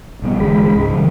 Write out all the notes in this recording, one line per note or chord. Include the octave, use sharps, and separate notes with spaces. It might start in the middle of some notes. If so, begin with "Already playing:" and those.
A#1 G3 B3
G1 E2 D3 G#3 B5
C#2 G#2
D3 E3 G3